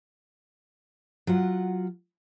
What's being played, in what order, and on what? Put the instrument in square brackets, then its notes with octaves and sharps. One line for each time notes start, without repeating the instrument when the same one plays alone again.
[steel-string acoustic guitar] F#3 F4 F#5